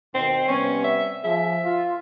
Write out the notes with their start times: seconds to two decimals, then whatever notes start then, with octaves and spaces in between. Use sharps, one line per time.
0.14 D#2 B2 D#3 C4
0.48 C3 G3 B3 C#4
0.84 E5
1.24 F3 G#4 E5
1.65 F4